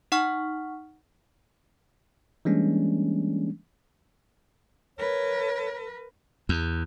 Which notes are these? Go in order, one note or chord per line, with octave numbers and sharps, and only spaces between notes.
D#4 F#5 C#6 F6
E3 G3 G#3 A#3 C#4 D4
A#4 B4 C#5
E2